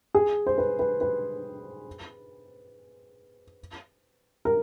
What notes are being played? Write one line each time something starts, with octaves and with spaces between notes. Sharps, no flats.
G#4
C5
B4
B4
B4
A#4